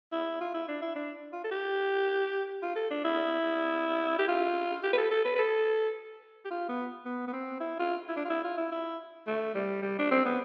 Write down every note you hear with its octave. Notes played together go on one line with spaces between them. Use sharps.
E4
F4
E4
D4
E4
D4
F4
A4
G4
F4
A4
D4
E4
G4
F4
G4
B4
A4
A4
B4
B4
A4
G4
F4
B3
B3
B3
C4
E4
F4
E4
D4
F4
E4
F4
E4
E4
A3
G3
G3
D4
C4
B3